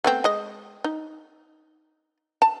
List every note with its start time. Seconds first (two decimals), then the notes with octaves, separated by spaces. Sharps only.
0.04 A3 B3 C4
0.24 G#3 D#5
0.84 D#4
2.42 A5